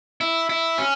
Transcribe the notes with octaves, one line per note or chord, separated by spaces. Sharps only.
E4
E4
C#4